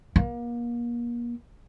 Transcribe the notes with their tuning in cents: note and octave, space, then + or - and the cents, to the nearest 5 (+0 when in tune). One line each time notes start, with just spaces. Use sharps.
A#3 +35